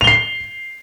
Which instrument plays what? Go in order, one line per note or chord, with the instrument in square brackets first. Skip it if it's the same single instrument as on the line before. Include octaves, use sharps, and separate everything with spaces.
[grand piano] F7
G7
C7